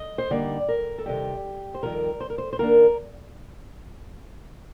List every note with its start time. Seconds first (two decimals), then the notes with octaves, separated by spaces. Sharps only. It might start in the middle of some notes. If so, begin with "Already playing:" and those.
Already playing: D#5
0.18 C5
0.31 D3 G3 A#3 D#4 D5
0.68 A#4
0.98 A4
1.06 C3 D#3 G3 G4
1.74 C5
1.83 F2 D#3 G3 A#4
2.20 C5
2.30 A#4
2.38 C5
2.53 C5
2.59 D#3 A#3 D4 A#4